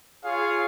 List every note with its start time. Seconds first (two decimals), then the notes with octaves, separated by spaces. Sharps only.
0.24 F4 G#4 C#5 F5